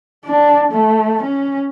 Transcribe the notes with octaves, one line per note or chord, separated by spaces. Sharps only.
D4
A3
C#4